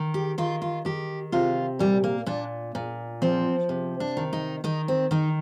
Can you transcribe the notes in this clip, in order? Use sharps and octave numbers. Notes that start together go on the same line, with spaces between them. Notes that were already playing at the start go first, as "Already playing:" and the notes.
Already playing: D#3
G4
D#3 F4
F4
D#3 G4
C3 F4
A#2 G3
A#3
A#2 D4
A#2
F3 C4
C3
D4
D#3
D#4
D#3 D#4
C4
D#3 D#4